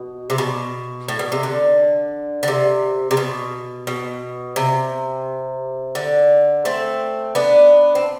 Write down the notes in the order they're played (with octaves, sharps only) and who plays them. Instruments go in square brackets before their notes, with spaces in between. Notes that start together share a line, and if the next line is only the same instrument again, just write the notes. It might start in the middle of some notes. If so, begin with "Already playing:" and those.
Already playing: [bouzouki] B2
C3
B2
A2
B2
C3
D3
D3
C3
C3
B2
B2
C3
D3
A3 C4
B3 D4
C4